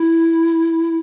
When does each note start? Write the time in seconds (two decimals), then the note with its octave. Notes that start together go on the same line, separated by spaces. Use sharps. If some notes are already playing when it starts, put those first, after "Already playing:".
Already playing: E4